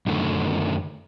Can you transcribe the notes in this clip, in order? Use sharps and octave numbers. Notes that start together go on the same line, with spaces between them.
F#2 D3 D#3 A3